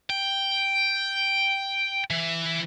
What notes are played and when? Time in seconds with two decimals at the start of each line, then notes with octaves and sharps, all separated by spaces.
0.10 G5
2.11 E3